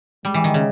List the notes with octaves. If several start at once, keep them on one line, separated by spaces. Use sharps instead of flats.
G3 G#3
E3
D#3
C#3